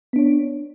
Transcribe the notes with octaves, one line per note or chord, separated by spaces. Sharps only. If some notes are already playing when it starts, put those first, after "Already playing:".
B3 D4 C#5